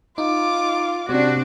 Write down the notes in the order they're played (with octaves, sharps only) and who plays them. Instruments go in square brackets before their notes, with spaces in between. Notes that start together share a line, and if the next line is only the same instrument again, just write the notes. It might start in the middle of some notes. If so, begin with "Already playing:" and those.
[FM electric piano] D#4 [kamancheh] F4 D6
[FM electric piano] C3 [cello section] C4 D4 [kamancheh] F#4